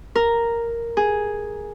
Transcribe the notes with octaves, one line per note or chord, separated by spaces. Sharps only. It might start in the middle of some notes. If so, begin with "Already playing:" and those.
A#4
G#4